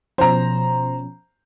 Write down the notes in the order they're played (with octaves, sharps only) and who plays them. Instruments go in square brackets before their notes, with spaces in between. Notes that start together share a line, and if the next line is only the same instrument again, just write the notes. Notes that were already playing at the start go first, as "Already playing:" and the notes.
[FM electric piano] B2 F3 C#4 [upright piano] C5 A#5